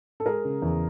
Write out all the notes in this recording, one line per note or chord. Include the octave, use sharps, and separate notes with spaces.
A4
G#3 G#4 A#4
C#3
E2